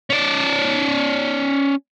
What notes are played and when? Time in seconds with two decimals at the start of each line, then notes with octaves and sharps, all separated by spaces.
0.10 C#4 D5